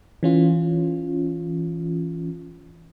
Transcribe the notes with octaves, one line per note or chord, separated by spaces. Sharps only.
E3 C#4 F4